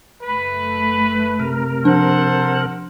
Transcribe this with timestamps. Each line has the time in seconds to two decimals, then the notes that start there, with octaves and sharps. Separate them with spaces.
0.22 F#1 A3 B4
1.40 C3 A#4
1.85 F3 D4 A4 C5 F#5